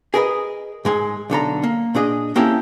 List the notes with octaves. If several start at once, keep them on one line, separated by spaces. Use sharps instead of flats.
G#4 A#4 B4 D#5
G#2 G#3 G#5
B1 D3 A4 A#5
A#3
A#2 D4 G#4 D#5
A#3 C4 C#4 E4 G4 A4